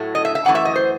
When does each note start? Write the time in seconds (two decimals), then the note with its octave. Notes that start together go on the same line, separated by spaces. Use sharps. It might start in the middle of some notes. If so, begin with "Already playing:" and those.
Already playing: A2 F#3 A3
0.15 D#5
0.25 E5
0.35 E5
0.45 F#2 E3 A3 F#5
0.55 E5
0.65 D#5
0.76 C5